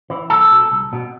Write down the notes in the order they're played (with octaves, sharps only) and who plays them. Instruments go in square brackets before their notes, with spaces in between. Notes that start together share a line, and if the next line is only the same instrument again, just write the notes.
[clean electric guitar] E3
C2 A4
B2
C2
B2